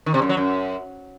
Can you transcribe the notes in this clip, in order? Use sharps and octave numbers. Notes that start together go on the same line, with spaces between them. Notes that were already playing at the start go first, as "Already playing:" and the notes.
D#3
C3
F#2
F#3
F#2